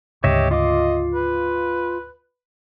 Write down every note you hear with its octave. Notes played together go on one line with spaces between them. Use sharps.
D2 G#2 C#3 G4 C#5 D#5 E5
F4 D#5 F5 D6
B4